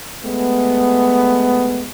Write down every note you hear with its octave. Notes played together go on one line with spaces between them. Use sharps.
G#3 A3 B3